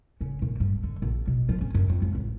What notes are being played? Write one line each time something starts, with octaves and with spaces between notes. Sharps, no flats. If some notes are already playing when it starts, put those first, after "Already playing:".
C#3
A#2
G2
D3
A#1
B2
F3
C#4
F#2
F2
C#2
A1